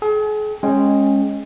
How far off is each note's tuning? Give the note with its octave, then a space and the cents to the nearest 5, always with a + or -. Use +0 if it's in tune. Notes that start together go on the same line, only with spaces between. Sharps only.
G#4 +40 G5 +0
G#3 +0 C#4 -15 G5 +0